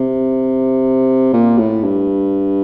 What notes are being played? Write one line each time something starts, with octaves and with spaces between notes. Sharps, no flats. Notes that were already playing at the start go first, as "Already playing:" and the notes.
Already playing: C3
A#2
A2
G2